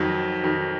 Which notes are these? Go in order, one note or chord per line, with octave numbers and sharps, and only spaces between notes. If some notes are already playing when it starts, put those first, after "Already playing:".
Already playing: F2 D#3 F#3
F2 D#3 F#3